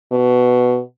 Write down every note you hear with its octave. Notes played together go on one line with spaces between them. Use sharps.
B2